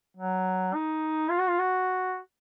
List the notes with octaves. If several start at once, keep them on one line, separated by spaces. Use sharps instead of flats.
F#3
D#4
F4
F#4
F4
F#4